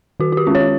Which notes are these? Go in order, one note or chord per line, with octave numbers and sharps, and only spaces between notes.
D#3 F#4
F#4
G4
G#3 C#4 F4
C#5